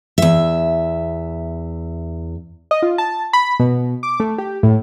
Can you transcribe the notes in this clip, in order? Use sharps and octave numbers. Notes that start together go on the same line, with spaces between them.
E2 E5
D#5
F4
A5
B5
B2
D6
A3
G4
A2